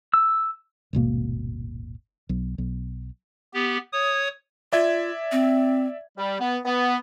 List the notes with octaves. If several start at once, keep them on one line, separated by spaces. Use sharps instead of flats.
E6
D#1 G#1 B2 A#3
B1
B1
B3 G4
C#5 D#6
F4 D5 E5 G#6
C4
G3
B3
B3